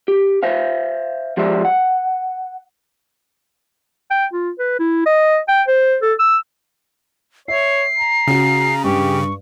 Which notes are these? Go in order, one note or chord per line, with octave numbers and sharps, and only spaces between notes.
G4
C5 E5 F5
F3 G#3 G4 C5 D5 E5
F#5
G5
F4
B4
E4
D#5
G5
C5
A4
E6
C#5 E5 C7
A#5
C#3 C#4 F#4
G2 G4 C#6